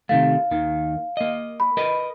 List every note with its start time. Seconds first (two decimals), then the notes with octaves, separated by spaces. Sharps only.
0.09 C3 D#3 A3 F5
0.51 D#2 D#3
1.17 A#3 D#5
1.60 B5
1.77 A#4 B4 D#5